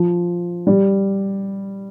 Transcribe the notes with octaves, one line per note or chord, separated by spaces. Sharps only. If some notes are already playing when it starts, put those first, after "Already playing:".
Already playing: F3
G3